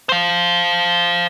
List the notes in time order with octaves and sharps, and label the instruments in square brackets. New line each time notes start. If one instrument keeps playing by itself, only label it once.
[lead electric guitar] C5 F5